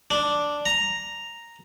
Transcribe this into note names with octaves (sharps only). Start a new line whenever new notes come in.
D4
A#5